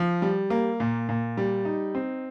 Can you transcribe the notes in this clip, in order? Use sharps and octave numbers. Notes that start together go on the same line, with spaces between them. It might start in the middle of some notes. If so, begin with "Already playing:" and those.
Already playing: F3
G3
A#3
A#2
A#2
G3
D#4
C4